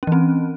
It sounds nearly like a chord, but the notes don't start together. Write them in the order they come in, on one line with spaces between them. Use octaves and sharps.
C#4 E3 C4